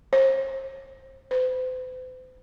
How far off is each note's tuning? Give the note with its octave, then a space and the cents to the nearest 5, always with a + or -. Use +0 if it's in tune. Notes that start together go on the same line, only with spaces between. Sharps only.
C5 +30
C5 -45